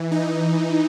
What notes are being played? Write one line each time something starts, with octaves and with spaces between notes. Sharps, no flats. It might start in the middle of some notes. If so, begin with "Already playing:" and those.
Already playing: E3
D#4